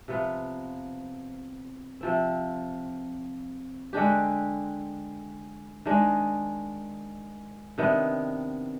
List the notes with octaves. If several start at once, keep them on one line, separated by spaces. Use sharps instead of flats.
C3 F3 B3 F4
C3 F3 C4
D3 G#3 D4 G4
D#3 G#3 D4
C3 D#3 B3 D4